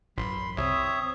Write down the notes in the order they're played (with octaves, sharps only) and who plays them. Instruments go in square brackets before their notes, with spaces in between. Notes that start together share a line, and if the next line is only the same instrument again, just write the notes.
[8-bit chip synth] A1 [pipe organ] F#2 B5 [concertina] C6
[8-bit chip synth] C2 [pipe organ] C4 [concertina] C#5 E5 [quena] D#6